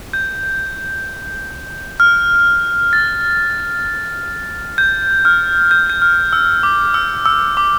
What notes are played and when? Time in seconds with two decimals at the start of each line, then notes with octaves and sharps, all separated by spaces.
0.13 G6
2.00 F6
2.93 A6
4.78 G6
5.25 F6
5.71 G6
5.90 G6
6.02 F6
6.33 E6
6.63 D6
6.94 E6
7.26 E6
7.57 D6